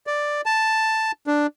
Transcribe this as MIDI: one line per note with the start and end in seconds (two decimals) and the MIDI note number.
0.07 0.41 74
0.46 1.12 81
1.27 1.47 62